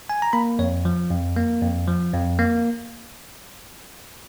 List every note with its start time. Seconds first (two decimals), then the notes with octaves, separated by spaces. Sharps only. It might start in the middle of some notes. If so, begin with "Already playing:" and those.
0.09 G#5
0.22 A#5
0.33 A#3 B5
0.59 F2 C#5
0.85 F3
1.11 F2
1.37 A#3
1.61 F2
1.87 F3
2.13 F2
2.39 A#3